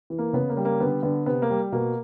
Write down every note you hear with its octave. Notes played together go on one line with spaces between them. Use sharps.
E3
A#3
C#3 B3
A#3
G3
A#3
D3 B3
D3 B3
C3 B3
A#3
G3
B2 A#3